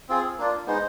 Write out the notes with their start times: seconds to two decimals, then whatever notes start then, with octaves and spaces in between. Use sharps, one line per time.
0.09 C4 F4 G#4
0.38 A#3 D4 F4
0.67 G#3 B3 D#4 C5